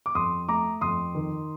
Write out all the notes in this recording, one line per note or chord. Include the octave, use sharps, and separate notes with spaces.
D6
F2 C6 D#6
A3 A#5 D6
F2 C6 D#6
D#3